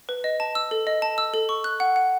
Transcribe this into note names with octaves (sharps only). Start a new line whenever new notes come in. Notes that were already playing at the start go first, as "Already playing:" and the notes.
B4
D#5
A5
E6
A4
D#5
A5
E6
A4
C#6
F#6
F#5
F#5